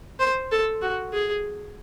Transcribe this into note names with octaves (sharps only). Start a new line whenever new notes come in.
C5
A4
F#4
G#4